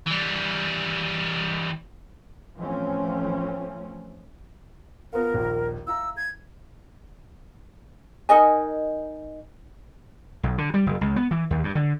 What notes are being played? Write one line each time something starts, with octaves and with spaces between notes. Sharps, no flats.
E3 G3
A1 E3 F3 A3 C4 C#4
B3 F4 A#4 F5
A#1 D#2 A#2
E4 F5 A#5 E6
G#6
D#4 A#4 D#5 G#5
B1
D3
G3
F#1
C#2
B3
E3
D#2
G2
D3